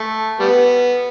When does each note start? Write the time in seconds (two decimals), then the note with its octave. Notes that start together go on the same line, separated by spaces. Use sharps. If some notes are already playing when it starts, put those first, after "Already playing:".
Already playing: A3
0.39 G3 B3